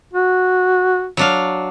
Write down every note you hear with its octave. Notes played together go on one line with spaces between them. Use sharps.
F#4
F#3 D4 F5